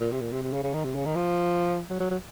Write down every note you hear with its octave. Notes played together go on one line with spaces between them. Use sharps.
A#2
C3
A#2
C3
C3
C#3
C#3
D#3
C3
C#3
D#3
F3
F#3
F#3
F#3